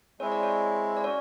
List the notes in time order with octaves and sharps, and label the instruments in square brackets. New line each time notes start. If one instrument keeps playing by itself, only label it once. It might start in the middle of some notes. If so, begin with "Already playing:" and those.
[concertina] G#3 C4 E4 [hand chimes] C#5
[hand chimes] D5
C#5
D5
[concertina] C#4 F#4 [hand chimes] C#5